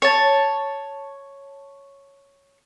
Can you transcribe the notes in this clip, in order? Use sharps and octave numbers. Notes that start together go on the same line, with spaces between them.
C#5 A5